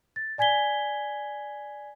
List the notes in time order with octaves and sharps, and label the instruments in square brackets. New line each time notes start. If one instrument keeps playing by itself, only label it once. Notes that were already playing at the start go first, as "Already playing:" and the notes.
[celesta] A6
D5 G#5 G#6 B6 G7